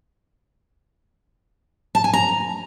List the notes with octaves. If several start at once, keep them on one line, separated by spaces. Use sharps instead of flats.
A5
G#5
A#5